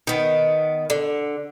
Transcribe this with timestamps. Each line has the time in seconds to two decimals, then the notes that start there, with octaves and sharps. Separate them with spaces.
0.07 D#3 B3
0.90 D3